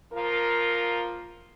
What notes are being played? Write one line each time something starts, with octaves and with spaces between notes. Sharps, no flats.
F3 A#3 F4 A#4